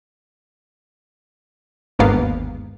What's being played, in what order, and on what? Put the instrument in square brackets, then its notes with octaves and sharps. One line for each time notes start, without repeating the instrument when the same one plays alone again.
[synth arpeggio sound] G1 D#2 G#2 A#3 B3 F5